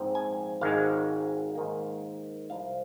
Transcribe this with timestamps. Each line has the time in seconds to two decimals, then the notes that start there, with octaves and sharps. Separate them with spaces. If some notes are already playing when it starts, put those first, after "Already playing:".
Already playing: A#1 G#2 F3 C4
0.15 G#5
0.61 G#1 G#2 D#3 G#3 F5
1.55 G#2 D#3 A#3
2.50 C2 C3 F3 F5